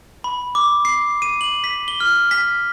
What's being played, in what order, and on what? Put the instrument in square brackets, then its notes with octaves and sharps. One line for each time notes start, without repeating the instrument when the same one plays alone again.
[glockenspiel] B5
D6
C7
D#7
F#7
B6
G7
F6
B6